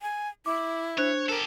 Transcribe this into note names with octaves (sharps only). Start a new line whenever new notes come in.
G#5
E4 D6
D4 C5 C#5 F#6
G4 A4 A#4